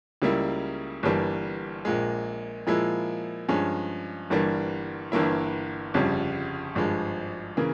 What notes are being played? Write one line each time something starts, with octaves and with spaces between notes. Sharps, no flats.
C#2 C#3 G3 A#3 E4
G1 G2 E3 G3 A#3
A#1 A#2 G#3
A#2 F3 G#3 E4
G2 F3 G#3 C#4
G1 G2 E3 G3 A#3
G1 G2 E3 A#3 E4
G1 F2 C#3 G3
G#1 G2 F3 G#3
C#3 E3 A#3